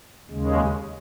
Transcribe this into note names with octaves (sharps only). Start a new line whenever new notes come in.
D#2 C#3 G#3